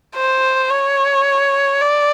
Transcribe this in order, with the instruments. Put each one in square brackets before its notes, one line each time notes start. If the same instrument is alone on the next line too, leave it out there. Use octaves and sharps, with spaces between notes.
[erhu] C5
C#5
D5